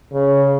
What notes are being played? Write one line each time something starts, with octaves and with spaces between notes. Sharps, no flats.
C#3